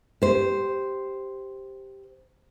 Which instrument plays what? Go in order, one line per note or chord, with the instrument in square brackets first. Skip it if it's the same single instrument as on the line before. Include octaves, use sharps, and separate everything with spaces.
[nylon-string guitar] G4 C5